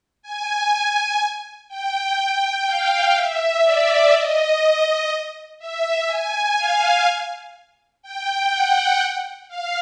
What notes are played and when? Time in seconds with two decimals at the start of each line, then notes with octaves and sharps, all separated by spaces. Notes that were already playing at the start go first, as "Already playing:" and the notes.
0.22 G#5
1.68 G5
2.17 G5
2.66 F5
3.14 E5
3.63 D5
4.12 D#5
5.59 E5
6.07 G#5
6.56 F5
8.02 G5
8.51 F#5
9.48 F5